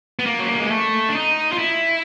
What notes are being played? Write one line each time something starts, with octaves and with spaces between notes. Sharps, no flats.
B3
A#3
F#3
G3
G#3
A3
D4
D#4
F4
E4